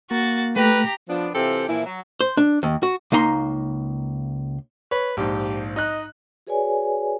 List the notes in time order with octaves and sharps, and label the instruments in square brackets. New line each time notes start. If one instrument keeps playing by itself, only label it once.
[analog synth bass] A#3 [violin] F#4 A6
[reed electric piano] A3 [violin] G4 A#5 [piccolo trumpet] B4
[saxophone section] F3 B3 D4
C3 E3 C4 F4 G4 A4
A#2 E3 F3 A#3 E4
F#3
[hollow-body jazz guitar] C5
D4
D#2
F#4
C#2 A#3 D#4 A#5 C6
[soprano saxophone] B4 [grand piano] C#5
[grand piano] A#1 G#2 [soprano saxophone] G4
[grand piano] D#4 F#6 [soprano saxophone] D#5
[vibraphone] F#4 G#4 B4 C#5 D5 G#5